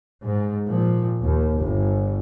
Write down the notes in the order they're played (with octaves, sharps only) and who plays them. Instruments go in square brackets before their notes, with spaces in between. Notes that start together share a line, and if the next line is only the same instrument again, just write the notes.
[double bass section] G#2
A#2 F3
D#2
G1